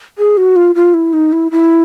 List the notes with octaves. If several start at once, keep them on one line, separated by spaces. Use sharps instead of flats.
G#4
F#4
F4
F4
E4
D#4
E4
E4